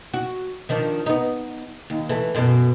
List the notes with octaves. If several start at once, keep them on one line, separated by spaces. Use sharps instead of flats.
F#4
D#3 F3 D4
B3 D#4
D#2
E3 A3
F#2 B2 A3